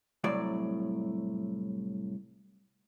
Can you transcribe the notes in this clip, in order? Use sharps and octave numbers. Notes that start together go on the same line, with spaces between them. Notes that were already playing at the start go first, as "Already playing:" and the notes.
C2 A2 F#3 D5